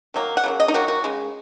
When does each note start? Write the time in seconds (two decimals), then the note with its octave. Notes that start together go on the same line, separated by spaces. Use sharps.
0.14 D#3 F#3 A#3
0.37 F#5
0.44 C#3 F#3 A#3
0.60 D#5
0.68 D#4
0.74 D#3 F#3 A#3 F#4
0.88 F#4
1.04 C#3 G#3